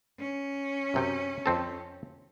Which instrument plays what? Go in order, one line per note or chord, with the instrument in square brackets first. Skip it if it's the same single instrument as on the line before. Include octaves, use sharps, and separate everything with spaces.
[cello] C#4
[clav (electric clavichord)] F#2 C3 G5
F2 C4 A4